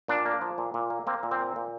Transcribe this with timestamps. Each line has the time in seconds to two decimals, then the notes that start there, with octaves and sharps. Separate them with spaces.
0.08 A#2 D4
0.26 A#3
0.41 F3
0.58 A#2
0.74 A#2
0.90 A#3
1.07 A#3 C4
1.23 A#2
1.31 C4
1.39 A#3
1.56 A#2